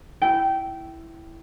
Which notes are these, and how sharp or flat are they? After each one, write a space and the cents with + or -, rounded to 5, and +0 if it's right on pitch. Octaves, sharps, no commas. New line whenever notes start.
E4 +0 G5 -20